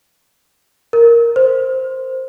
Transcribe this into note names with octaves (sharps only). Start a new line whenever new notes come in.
A#4
C5